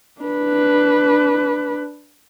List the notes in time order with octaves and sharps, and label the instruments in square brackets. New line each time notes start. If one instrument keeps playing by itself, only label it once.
[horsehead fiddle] D4 B4